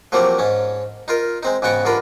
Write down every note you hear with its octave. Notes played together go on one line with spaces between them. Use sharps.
F3 F#3 A3 A#3 C4 G4
G#2 C#4
D#4 F4 A#4
G#3 C4 D#4
G#2 C#3 B3 F#4 G5 C#6
G2 D3 F4 A#4 B5